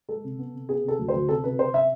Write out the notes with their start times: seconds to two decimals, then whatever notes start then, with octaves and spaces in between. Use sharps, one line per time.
0.09 G#3 A4
0.24 C3
0.39 B3
0.54 C3
0.69 B3 G#4
0.84 C3 A4
0.99 D2
1.08 C5
1.13 D2
1.29 C3 A4
1.44 C3 B4
1.59 C3 C5
1.74 E5